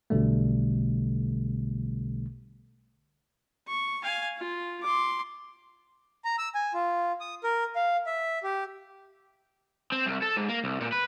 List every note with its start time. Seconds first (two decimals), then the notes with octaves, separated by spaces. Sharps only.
0.10 B1 B2 D3 G3 A3
3.68 C#6
4.03 F5 G#5
4.37 F4
4.82 C6 D6
6.25 A#5
6.38 E6
6.55 G#5
6.74 F4
7.21 D#6
7.44 A#4
7.76 F5
8.06 E5
8.43 G4
9.92 C4
10.07 C2
10.23 A4
10.37 G#2
10.49 A#3
10.64 C2
10.81 A#2
10.92 B4